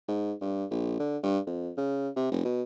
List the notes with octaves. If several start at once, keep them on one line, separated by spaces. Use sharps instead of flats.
G#2
G2
A#1
D3
G2
F2
C#3
C3
F1
B2